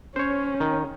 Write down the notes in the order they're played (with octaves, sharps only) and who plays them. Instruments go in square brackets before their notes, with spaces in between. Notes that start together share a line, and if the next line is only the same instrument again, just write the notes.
[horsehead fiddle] C#4 [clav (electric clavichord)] C5 C#5
[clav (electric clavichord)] D#3